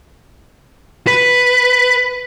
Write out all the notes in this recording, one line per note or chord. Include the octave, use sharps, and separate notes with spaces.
B4